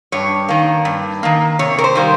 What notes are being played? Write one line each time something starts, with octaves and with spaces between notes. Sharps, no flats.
G2 C#5
D#3 A#3
G2
D#3 A#3
C3 C#5
A#4
C5
D#3 G3 A#3